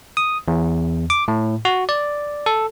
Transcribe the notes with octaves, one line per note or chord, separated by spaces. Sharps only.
D#6
E2
D6
A2
F#4
D5
A4